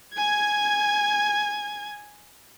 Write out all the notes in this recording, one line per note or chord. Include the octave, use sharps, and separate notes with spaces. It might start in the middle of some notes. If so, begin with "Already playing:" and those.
G#5 G#6